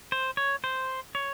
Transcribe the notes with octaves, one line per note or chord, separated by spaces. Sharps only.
C5
C#5
C5
C#5